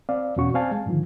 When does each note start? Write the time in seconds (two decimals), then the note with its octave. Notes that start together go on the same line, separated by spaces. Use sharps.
0.09 C4 D5 F5
0.36 E2 B2 C#4 F#4 C#6
0.54 C4 D5 F5 G#5 A5
0.71 G#3
0.86 G#2 D3 D#3 F3